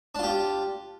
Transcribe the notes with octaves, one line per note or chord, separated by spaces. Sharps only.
D4 F4 G4